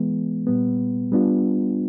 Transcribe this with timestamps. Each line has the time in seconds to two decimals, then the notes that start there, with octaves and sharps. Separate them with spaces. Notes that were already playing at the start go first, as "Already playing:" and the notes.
Already playing: E3 G#3 B3
0.47 A#2 G3 B3
1.12 G3 B3 D4 F4